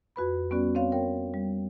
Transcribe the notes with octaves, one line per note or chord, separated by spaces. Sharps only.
F2 F#4 B4 B5
G3 B3 C#4 F#4 D5
C4 C#5 F5
A#4 C#5 G5
G3